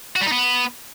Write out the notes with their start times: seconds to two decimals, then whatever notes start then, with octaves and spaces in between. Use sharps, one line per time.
0.16 F#4
0.21 G3
0.27 D#4
0.32 B3